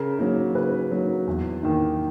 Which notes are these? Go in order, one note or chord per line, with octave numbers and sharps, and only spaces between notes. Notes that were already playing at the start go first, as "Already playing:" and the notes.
Already playing: C#3 A#4
F#3 A#3 D#4
C#3 B4
F#3 A#3 D#4
E2
D#3 A#3 D#4